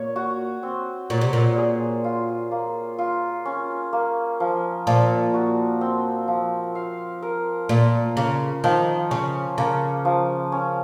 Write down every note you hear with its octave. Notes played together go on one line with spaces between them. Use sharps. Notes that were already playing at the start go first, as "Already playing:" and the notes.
Already playing: A#2 C#5
F#4
C4
A#2 C#5
C3
A#2
G#4
F4
A#3
F4
C#4
A#3
F3
A#2 F3
F#4
C4
F3
F5
A#4
A#2 F4
C#3 A#3
D#3 F3
C#3 C#4
C#3 A#3
F3
C#4